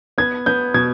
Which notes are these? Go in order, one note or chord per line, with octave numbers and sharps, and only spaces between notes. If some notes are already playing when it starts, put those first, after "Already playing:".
B3 G#6
B3 G6
B2 G#6